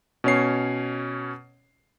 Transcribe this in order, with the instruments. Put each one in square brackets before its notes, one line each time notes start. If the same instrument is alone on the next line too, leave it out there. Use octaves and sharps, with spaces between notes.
[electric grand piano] B2 C#4 C#5 C7